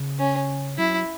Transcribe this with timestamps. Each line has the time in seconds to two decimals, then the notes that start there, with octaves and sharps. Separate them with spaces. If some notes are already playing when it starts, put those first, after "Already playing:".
Already playing: C#3
0.19 C#4
0.78 F#3 E4